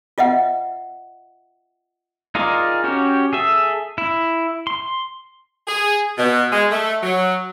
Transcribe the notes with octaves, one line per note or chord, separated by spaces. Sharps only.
F4 D#5 E5 F#5
D#4 F4 G#4 A#4 D5
C#4 F#4 G4
G#4 A4 E5
E4
C6
G#4
B2
G#3
A3
F#3